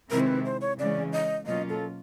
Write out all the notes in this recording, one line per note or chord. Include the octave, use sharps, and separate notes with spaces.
C3 D#3 G#3 C4 E4 A#4
C5
B4
C5
C#5
C#3 E3 G#3 C#4 D5
D#5
B2 F#3 A#3 C#4 F4 D#5
A4